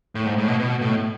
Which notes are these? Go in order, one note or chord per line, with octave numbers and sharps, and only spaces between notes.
A2
G#2
A2
B2
B2
A2